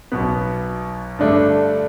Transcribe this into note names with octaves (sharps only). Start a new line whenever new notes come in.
B1 B2 B3
G2 D3 A3 D4